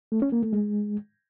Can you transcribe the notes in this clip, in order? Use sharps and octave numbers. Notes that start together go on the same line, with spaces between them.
A3
C#4
A#3
A3
G#3